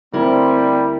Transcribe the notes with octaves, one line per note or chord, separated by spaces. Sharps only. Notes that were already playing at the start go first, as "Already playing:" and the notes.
D2 G3 C4 E4 A#4